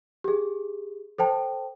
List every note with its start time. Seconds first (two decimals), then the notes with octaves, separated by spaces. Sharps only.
0.24 G4 G#4
1.18 A4 C5 G5 A5